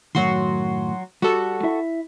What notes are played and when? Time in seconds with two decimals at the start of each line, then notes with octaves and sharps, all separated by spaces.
0.15 F#2 A2 D#3 F#3 F#4 C6
1.22 G3 F#4 A4
1.63 E4 E5